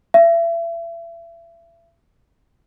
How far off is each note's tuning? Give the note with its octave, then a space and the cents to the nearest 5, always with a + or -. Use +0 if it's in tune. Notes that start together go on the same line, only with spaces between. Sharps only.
E5 +35